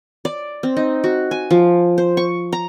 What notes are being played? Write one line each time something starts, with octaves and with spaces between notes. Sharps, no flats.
D5
C4
D#4
F#4
G#5
F3
C5
C#6
A#5